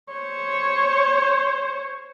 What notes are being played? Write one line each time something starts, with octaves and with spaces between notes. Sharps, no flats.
C5 C#5